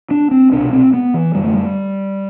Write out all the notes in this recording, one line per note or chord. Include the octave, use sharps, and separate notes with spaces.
D4
C4
C2 B2 D4
C4
B3
E3
F#2 D3 G3
A3
G3